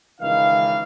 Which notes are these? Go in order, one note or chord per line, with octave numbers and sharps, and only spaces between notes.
C#2 D#3 E3 D#4 F5